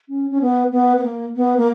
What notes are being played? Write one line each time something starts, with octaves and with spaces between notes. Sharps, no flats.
C#4
C#4
B3
B3
B3
A#3
B3
A#3